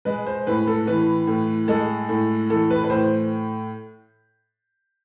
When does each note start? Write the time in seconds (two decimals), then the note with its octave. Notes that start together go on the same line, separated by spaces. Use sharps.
0.05 G#3 B4
0.27 C5
0.47 A2 B4
0.67 A4
0.87 E3 B4
1.27 A2
1.68 G#3 A4
2.09 A2
2.50 E3 A4
2.70 B4
2.84 B4
2.90 A2 C5